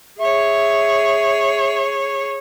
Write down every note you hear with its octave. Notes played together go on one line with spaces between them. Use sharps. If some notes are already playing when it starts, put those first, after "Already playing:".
G#4 C#5 E5